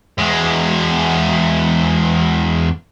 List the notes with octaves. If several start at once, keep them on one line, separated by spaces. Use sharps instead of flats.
E2 G#3